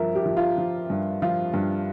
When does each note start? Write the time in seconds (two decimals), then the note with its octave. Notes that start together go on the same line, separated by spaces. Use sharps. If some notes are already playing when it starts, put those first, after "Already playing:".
Already playing: G2 F3 A#4 E5
0.15 G4
0.26 F3
0.37 F4
0.58 F3
0.90 G2
1.22 F3 F4
1.54 G2